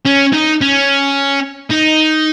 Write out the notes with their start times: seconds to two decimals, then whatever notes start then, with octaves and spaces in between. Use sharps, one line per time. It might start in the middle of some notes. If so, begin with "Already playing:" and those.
0.05 C#4
0.33 D#4
0.61 C#4
1.71 D#4